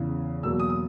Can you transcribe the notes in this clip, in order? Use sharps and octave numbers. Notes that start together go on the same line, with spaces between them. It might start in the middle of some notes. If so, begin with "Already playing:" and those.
Already playing: E2 C#3 E3
E2 B2 F#3 A#3 E6
D#6
D#6